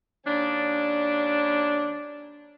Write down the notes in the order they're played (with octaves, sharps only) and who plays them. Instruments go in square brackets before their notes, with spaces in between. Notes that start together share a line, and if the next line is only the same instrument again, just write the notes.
[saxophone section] D#2 C#4 D4